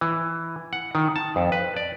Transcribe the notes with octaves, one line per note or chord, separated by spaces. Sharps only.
E3
F#5
D#3
A5
F2
B4
D5